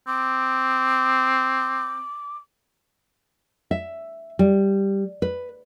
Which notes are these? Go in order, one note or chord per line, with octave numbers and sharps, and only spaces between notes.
C4 D6
E5
G3
B4